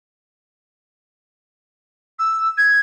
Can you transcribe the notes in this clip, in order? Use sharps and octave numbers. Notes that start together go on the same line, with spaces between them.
E6
G#6